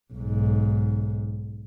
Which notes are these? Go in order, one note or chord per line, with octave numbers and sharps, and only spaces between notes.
B1 G#2